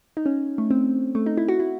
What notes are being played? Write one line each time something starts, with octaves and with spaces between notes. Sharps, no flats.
D#4
C#4
A3
C4
A3
D#4
E4
F#4
E4